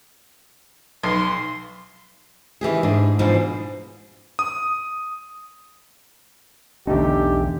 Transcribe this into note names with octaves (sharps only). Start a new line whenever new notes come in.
B1 C6
D#3 E3 G4 G#4
G#2 D4
G#2 B2 E3 F3 D4 D#4
D#6
B1 E2 D3 A3 C#4 D#4 G4